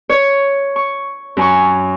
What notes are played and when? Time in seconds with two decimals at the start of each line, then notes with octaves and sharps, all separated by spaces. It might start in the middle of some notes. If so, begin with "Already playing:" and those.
0.09 C#5
0.76 C#6
1.37 F#2 G#5 C#6